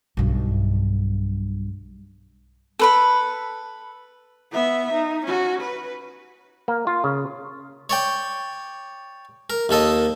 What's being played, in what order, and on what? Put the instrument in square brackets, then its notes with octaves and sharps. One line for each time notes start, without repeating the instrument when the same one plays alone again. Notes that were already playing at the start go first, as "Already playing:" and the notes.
[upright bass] B1 G2
[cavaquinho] A4 B4 B5
[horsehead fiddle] B3 E5
D#4
C#4 F#4
B4
[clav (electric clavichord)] A#3
F4
C#3
[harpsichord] C#5 D5 G5
A#4
D#2 A#3 A4 D#5